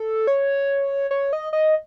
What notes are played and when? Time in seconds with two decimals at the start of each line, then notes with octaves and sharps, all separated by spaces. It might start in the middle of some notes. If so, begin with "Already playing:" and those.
Already playing: A4
0.27 C#5
1.11 C#5
1.33 D#5
1.53 D#5